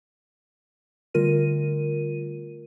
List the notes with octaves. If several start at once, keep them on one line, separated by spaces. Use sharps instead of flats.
D3 G3 A3 F4 A#4 D#7